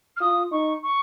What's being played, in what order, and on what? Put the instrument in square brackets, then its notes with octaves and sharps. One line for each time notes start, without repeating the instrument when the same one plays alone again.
[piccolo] F6
[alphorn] F4 [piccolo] D#6
[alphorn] D#4 [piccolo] C#6
[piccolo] C#6